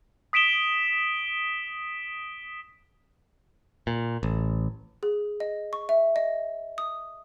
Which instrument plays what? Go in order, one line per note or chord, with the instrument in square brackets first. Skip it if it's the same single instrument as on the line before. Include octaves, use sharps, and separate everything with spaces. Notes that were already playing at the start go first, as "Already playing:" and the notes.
[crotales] D#6 B6 D7 E7 G7
[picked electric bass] A#2
A1
[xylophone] G#4
D#5
C#6
E5
D#5
D#6